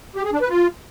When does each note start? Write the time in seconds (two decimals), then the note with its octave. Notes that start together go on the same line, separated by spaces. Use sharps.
0.16 G4
0.24 G#4
0.33 D4
0.41 B4
0.49 F4